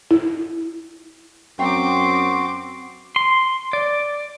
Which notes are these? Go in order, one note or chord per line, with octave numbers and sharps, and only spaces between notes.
E4
F#2 C4 F#4 G5 A#5 C6 D6
C6
D5